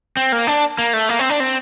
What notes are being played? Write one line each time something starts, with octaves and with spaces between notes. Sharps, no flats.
C4
A#3
D4
A#3
A3
A#3
C4
D4
C4